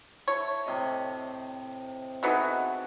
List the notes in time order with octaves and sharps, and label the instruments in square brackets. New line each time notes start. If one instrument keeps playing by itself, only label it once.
[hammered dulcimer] E4 A5 [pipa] C#5
[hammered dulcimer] A2 C3 D#5
[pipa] E3 B3 D#4 [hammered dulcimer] F#4 G#4 A4